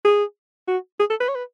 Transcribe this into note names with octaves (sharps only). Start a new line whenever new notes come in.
G#4
F#4
G#4
A4
B4
C#5
B4